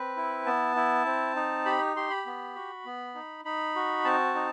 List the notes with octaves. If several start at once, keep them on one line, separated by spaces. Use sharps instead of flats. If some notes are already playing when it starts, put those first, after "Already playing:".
Already playing: C4 B4
E4
B3 A5
E4
C4
D#4
G4 B5
G4 C6
B5
B3
F#4
B3
D#4
D#4 B5
F#4
C4 A5
D#4